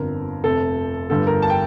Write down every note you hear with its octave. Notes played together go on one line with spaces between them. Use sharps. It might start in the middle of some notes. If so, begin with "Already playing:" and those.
Already playing: G1 F2 D3 A#4
F1 F2 C3 A4
G1 G2 D3 G3 A4
A#4
A5
G5